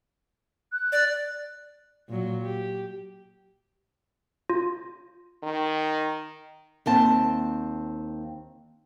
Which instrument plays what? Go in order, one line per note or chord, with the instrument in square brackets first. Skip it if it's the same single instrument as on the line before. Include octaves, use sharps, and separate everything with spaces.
[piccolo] F#6
[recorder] D5
[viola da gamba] A#2 F#3
G4
[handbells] F4
[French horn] D#3
[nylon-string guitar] D#2 C4 A5